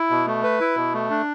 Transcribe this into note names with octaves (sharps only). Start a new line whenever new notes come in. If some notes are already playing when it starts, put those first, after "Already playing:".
Already playing: E4
B2
A3
B4
E4
B2
A3
D4